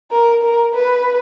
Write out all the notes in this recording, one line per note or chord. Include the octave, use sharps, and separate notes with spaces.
A#4
A#4
B4